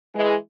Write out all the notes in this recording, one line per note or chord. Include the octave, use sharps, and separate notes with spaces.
E3 G#3